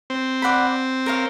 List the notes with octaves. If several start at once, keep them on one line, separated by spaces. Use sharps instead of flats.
C4
D5 F#5 B5
A#4 C#5 F5